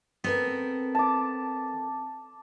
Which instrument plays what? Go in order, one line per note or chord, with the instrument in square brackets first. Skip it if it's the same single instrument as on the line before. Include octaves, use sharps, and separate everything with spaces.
[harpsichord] B3 [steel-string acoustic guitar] C4 A4 A#4
[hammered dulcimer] A5 D6